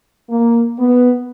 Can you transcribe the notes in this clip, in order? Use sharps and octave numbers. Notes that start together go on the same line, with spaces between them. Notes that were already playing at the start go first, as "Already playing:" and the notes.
A#3
B3